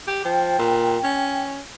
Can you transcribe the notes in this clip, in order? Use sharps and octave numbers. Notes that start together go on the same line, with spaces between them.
G4
F3 G5
A#2
C#4